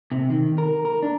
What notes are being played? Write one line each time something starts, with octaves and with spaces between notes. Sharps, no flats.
C3
D#3
A#4
A#4
D4